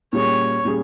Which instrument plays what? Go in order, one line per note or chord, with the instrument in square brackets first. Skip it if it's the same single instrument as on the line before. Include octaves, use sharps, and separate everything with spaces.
[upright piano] A#2 G3 C#4 G#4 [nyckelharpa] C#5
[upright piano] A#2 G3 C#4 G#4